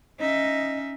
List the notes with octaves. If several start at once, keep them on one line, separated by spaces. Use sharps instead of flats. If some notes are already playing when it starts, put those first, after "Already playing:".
C#4 D#4 D#5 E5